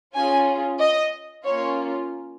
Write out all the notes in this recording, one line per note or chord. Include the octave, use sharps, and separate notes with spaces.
C#4 F4 G#4 G#5
D#5
A#3 C#4 F4 C#5